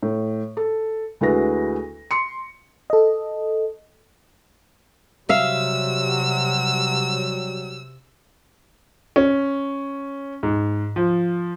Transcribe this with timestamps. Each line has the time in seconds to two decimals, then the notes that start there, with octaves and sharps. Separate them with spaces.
0.02 A2
0.57 A4
1.21 D2 G#3 E4 F#4 B4 A#6
2.11 C6 C#7
2.90 A4 D#5
5.29 C3 F#3 G3 E5 F5 E6
9.16 C#4
10.43 G#2
10.96 F3